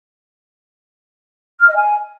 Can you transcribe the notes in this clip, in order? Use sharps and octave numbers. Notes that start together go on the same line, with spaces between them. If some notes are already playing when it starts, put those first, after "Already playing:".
F6
D#5
G#5